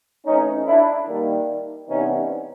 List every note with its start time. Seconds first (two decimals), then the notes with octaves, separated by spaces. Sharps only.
0.25 E3 A3 C4 C#4 D#4
0.66 D4 E4
1.07 D#3 G3 A#3
1.88 C3 E3 G3 B3 C#4 D#4